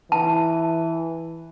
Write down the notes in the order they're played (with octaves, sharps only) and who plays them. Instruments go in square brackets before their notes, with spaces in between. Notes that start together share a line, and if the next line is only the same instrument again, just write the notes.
[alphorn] E3 [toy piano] A5